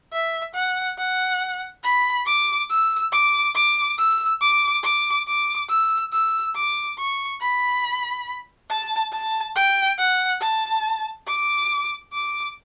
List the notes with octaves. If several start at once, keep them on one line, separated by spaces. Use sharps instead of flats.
E5
F#5
F#5
B5
D6
E6
D6
D6
E6
D6
D6
D6
E6
E6
D6
C#6
B5
A5
A5
G5
F#5
A5
D6
D6